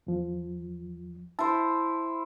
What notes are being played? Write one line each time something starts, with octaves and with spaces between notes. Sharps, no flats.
E2 F3
E4 C5 A5